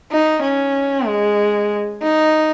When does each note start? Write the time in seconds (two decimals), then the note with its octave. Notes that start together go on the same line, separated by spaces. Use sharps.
0.12 D#4
0.42 C#4
1.06 G#3
2.03 D#4